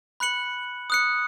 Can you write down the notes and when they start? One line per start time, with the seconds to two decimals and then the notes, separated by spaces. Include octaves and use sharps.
0.20 B5 F#6 C#7 F#7
0.90 D#6 F#6 C#7